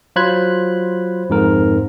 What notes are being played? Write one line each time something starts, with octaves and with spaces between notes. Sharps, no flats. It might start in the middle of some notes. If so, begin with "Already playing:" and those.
F#3 F4 C5 B5 F#6 G#6
F2 G#2 A#4